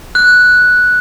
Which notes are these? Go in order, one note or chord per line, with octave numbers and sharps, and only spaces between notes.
F#6